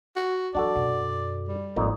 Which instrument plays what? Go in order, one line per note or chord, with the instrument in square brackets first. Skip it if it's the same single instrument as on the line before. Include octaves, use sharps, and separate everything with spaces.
[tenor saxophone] F#4
[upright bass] E3 F#3 [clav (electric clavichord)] D4 F#4 A4 [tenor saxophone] D5
[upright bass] F#2 B2
[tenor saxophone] G3
[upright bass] G#1 [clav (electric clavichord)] F2 A#2 D#4